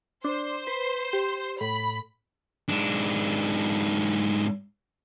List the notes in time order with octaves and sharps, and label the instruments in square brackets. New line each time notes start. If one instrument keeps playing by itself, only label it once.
[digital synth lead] D4 [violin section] C5
[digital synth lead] B4
G4
[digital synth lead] A2 [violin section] B5
[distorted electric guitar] G#2 D4